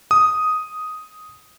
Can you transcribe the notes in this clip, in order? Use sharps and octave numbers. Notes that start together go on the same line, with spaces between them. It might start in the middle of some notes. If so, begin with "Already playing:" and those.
D#6